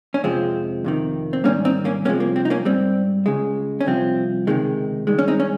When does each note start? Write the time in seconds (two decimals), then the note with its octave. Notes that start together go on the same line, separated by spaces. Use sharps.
0.14 C#4
0.24 F2 C3 F3 G#3 C4
0.84 F2 C3 D#3
1.33 C4
1.44 G#2 D#3 G3 A#3 C#4
1.65 C4 D#4
1.85 A#3 C#4
2.05 C2 C3 F3 G#3 A#3 C#4
2.20 A#3
2.36 C4
2.45 D#4
2.50 A#3 C#4
2.65 G#2 G3 C4
3.26 C#2 C#3 G#3
3.81 C#4
3.86 C2 C3 F3 C4
4.47 C#2 C3 D#3 G#3
5.07 G2 D#3 G#3
5.19 C#4
5.28 C4 D#4
5.40 C#4